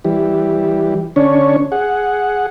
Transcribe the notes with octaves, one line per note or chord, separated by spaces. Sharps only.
E3 G3
D3 C#4 D4 C#5
G#4 F#5